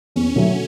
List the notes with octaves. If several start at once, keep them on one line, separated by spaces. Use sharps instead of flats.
E2 C#4
D3 F#3 A3